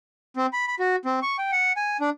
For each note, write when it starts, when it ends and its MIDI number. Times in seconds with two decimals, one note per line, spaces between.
0.37 0.46 60
0.53 0.66 83
0.68 0.75 83
0.79 0.96 66
1.05 1.20 60
1.22 1.37 85
1.38 1.51 79
1.52 1.72 78
1.77 1.97 80
2.00 2.10 62